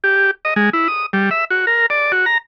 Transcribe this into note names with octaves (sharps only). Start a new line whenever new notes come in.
G4
D#5
G#3
E4
D#6
G3
E5
F#4
A#4
D5
F#4
A#5